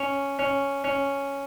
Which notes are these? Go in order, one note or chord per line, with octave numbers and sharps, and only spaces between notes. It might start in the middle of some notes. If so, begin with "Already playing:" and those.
Already playing: C#4
C#4
C#4